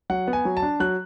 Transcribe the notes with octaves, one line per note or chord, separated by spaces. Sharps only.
F#3 F#5
B3
G#5
F#3
A5
D4
F#3 F#6